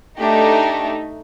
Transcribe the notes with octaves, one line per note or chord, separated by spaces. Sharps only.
A3 D4 D#4 G4